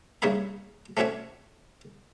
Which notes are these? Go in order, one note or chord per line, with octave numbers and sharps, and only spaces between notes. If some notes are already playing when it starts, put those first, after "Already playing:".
G2 C#3 A#3 C#5 E5 B5
A3 C4 C#4 F#4 C#5 E5